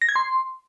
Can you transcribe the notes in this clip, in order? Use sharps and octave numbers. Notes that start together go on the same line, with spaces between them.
A#6
G#6
C6